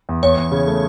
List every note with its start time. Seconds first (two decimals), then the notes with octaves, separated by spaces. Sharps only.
0.09 E2
0.23 E2 C#5
0.37 E2
0.52 C#3
0.67 A3